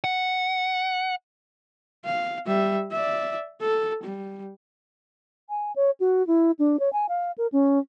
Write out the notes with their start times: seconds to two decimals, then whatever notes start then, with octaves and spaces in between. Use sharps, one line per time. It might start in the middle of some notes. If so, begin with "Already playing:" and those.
0.04 F#5
2.05 F5
2.46 G3 E5
2.92 D5 E5
3.60 A4
4.03 G3
5.49 G#5
5.76 C#5
6.00 F#4
6.27 E4
6.59 D4
6.80 C#5
6.93 G#5
7.09 F5
7.38 A#4
7.52 C#4